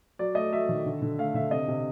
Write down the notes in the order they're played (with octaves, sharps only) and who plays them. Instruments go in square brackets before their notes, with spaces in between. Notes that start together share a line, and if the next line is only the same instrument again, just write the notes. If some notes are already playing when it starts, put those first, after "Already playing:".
[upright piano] F#3 D5
A3 D#5
F#3 E5
D#3
D3
D3
A3 F5
D3 E5
C3 D#5
C3